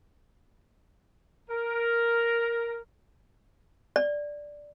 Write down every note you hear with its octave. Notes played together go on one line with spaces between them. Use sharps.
A#4
D5